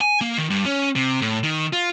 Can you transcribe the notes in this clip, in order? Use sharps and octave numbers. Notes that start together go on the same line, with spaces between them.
G#5
A#3
D#3
G2
C#4
C3
A2
D#3
F4